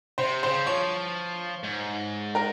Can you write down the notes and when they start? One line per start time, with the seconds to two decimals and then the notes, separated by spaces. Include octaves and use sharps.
0.18 C3 C5
0.43 C#3 C5
0.67 F3 C#5
1.63 G#2
2.35 A#4